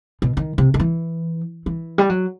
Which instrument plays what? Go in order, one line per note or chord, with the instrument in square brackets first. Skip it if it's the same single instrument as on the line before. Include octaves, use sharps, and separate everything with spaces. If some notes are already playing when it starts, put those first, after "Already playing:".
[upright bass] B2
D#3
C3
D#3
E3
E3
G3
F#3